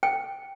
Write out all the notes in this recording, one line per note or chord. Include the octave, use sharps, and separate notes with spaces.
G5